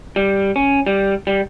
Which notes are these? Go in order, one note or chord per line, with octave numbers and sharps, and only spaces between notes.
G3
C#4
G3
G3